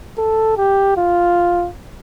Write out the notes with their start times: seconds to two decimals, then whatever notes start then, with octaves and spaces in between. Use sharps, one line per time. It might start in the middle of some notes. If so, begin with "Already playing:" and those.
0.18 A4
0.57 G4
0.97 F4